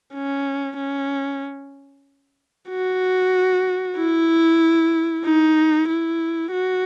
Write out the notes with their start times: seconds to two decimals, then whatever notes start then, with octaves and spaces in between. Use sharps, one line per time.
0.15 C#4
0.78 C#4
2.70 F#4
3.97 E4
5.25 D#4
5.89 E4
6.52 F#4